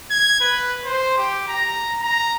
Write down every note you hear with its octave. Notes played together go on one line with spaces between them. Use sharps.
G#6
B4
C5
G4
A#5
A#5